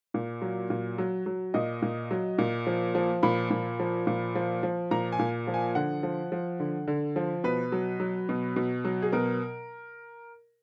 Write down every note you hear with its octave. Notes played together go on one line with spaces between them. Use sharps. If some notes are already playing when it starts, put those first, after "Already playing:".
A#2
F#3
A#2
F#3
F#3
A#2 D#5
A#2
F#3
A#2
F3
F3
A#2 B5
A#2
F3
A#2
F3
F3
A#2 A#5
G#5
A#2
F3
G#5
D3 F#5
F3
F3
D3
D3
F3
B2 B4
F#3
F#3
B2
B2
F#3
G#4
B2 A#4